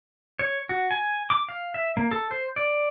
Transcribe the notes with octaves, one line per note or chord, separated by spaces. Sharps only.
C#5
F#4
G#5
D6
F5
E5
A#3
A4
C5
D5